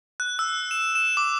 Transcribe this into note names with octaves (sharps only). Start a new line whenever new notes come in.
F#6
E6
E7
E7
D6